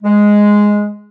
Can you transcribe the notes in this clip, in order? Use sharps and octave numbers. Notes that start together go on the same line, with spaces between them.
G#3